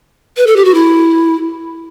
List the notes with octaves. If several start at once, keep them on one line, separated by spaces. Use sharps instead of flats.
B4
A4
G4
F#4
E4